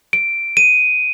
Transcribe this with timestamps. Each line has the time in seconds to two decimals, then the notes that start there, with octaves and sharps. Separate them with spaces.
0.13 D7
0.57 D#7